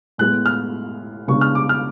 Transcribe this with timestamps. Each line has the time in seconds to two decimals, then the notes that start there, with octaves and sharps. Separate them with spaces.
0.18 A2 G#3 B3 F#6
0.46 F6
1.28 C#3 G#3 B3 D4 C#6
1.41 F6
1.55 D6
1.69 F6